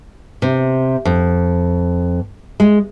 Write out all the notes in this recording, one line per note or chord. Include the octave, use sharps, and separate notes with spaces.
C3
F2
G#3